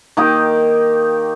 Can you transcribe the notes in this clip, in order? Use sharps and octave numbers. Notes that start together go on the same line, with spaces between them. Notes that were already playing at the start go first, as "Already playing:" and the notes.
D#3 A#3 D#4 G4